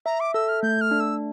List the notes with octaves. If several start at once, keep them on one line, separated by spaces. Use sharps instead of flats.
E5 A#5
D6
A4 E6
F6
A3 G6
F6
D4
E6